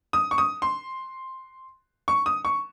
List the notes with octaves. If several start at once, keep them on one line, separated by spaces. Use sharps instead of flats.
D#6
C#6
D#6
C6
C#6
D#6
C#6